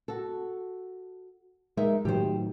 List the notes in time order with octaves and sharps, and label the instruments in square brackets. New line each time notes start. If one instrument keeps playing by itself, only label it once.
[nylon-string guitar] F#4 A4
[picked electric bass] G#3 [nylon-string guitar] D#4 A#4 E5
[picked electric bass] A2 D#3 F#3 [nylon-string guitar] G4 C5